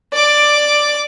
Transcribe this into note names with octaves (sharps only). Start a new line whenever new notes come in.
D5 D6